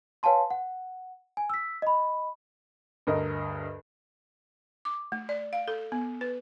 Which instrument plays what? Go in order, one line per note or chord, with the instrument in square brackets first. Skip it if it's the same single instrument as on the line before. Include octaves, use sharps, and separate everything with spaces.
[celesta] B4 C#5 F5 G#5 A5 C6
F#5
G#5
E6 B6
D#5 B5
[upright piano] D2 G2 A#4 D#5
[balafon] D6
A3
D5
F5
A4
B3
B4